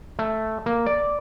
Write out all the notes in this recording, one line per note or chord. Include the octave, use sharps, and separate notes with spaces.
A3
A#3
D5